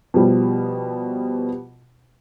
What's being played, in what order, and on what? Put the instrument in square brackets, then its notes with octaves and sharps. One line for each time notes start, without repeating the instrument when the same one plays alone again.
[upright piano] B2 F3 G3